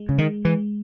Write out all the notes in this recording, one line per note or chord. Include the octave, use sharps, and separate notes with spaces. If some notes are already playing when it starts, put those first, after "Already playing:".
Already playing: G#3
C#3
D#3 G#3
E3 G#3